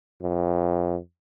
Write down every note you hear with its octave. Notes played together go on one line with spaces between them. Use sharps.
F2